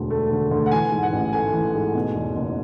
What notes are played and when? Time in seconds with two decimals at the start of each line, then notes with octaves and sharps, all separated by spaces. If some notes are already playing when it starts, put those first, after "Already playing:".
Already playing: E1 D2 D3
0.10 A3
0.31 D3
0.51 D2
0.66 F#5
0.71 E3 G#5
0.92 G#2
1.03 F#5
1.13 A1
1.33 A3 G#5
1.53 E3
1.75 G#2
1.95 B2
2.15 E2
2.36 F#1